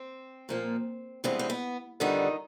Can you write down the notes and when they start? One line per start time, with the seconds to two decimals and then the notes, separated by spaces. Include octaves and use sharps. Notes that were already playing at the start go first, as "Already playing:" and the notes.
Already playing: C4
0.49 A#2 F3 A#3
1.24 G2 E3 G#3 B3 C4
1.39 C4
1.50 B3
2.00 F2 D3 D#3 G3 B3 D#4